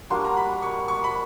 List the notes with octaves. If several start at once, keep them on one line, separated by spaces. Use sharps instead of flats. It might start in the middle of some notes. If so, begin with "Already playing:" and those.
G3 A#3 D4 F#4 C6
A#5
B5
C#6
C#6
B5